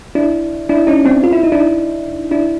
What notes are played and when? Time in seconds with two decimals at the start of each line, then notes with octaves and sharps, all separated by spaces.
0.15 D4 E4
0.69 D4 E4
0.87 C#4 D#4
1.05 C4 D4
1.24 F4
1.33 E4
1.43 D#4
1.52 D4 E4
2.31 D4 E4